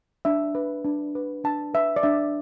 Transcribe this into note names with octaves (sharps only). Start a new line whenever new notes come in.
D4 E5
B4
D4
B4
D4 A5
B4 E5
D5
D4 E5